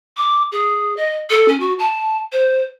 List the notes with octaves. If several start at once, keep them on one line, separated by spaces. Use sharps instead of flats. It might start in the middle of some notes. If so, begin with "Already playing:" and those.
D6
G#4
D#5
A4
C#4
F#4
A5
C5